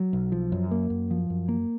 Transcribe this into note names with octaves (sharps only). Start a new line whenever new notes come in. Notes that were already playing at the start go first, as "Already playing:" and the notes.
Already playing: F#3
B1
F3
F#2
A#3
F#2
F3
F#2
A#3